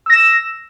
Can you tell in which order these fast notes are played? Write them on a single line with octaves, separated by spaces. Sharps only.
E6 A#6 E7